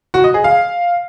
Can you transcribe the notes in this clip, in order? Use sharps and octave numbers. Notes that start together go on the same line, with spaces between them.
F#4
D#5
G#4
F5